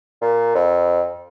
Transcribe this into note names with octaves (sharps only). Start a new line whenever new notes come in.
A#2
F2